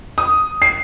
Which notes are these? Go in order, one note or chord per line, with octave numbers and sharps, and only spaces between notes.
D#6
C7